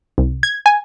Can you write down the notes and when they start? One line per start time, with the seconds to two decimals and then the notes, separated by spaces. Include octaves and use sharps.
0.18 C2
0.43 G#6
0.66 G#5